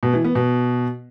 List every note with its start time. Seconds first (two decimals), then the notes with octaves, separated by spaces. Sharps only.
0.03 B2
0.14 E3
0.24 B3
0.35 B2